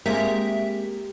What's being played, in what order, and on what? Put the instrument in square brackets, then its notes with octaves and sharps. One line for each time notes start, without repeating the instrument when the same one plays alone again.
[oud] G#3 [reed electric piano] A#3 C4 G#4 [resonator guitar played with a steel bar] G4 A#4 [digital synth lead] E5